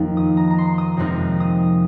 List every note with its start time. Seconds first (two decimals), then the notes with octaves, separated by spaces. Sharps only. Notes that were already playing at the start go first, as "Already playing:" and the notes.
Already playing: F2 D#3 A#3 D#4
0.17 D#6
0.37 A#5
0.50 A#5
0.58 C6
0.78 D#6
0.97 F2 C3 G#3 C4 D#4 F6
1.40 D#6